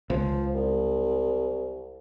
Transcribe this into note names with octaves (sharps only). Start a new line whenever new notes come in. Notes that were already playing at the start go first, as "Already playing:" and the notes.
C#2 F3
C2